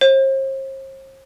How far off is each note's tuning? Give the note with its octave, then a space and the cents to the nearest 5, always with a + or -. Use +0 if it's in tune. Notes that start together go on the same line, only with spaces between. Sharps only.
C5 +45